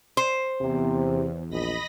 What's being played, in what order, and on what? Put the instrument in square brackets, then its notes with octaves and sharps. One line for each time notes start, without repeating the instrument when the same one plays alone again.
[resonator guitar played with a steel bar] C5
[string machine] E2 [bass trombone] C3
[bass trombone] A#1 [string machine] D#5 B5 A#6